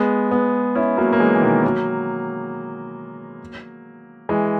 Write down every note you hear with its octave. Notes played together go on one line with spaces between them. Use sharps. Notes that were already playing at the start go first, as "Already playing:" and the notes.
Already playing: G#3 B3
G#3 B3
C#4 E4
F#3 A#3
A#3
E3 G#3
E3
B2 D#3
F#3 A#3
E3 G#3